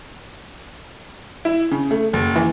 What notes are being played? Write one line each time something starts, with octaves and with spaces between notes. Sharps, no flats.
E4
C#3
A3
F#1
E3